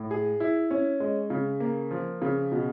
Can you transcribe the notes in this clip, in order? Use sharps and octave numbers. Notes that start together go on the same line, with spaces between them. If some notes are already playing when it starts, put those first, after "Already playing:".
Already playing: A2
G#4
E4
C#4
G#3
C#3
A#3
F3
C#3
B2